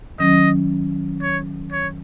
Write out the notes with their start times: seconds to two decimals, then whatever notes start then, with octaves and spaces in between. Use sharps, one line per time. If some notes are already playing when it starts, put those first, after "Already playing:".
0.19 D#3 F#3 C#4 D#5
1.22 C#5
1.72 C#5